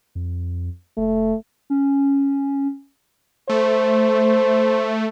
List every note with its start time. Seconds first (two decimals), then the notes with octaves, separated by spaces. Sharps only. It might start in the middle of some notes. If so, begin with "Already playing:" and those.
0.15 F2
0.98 F1 A3
1.70 C#4
3.49 A3 C5